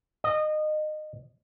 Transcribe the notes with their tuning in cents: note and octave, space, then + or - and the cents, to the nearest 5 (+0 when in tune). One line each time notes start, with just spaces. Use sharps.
D#5 -25